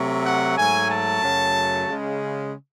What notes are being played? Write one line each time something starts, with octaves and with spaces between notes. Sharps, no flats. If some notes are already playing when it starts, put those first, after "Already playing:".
Already playing: C3 F#3 A3
F#5
G#2 F#3 A3 G#5
A5
F#2 C#3 F#3 A3
C#3 G#3